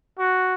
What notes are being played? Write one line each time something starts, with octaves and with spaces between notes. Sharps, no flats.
F#4